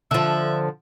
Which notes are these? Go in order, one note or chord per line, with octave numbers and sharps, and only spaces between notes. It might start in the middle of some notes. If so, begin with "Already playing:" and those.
D3 F3 E5